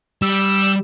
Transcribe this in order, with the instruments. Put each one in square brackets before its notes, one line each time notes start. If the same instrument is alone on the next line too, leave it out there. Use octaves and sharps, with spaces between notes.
[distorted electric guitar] G3 [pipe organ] E6